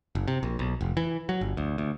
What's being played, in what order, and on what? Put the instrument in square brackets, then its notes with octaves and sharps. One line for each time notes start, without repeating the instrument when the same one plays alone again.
[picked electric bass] F#1
C3
A#1
B1
F1
E3
F#3
G1
D2
D2